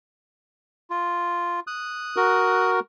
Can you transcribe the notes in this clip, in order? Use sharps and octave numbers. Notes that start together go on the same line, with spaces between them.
F4
D#6 F#6
F#4 A#4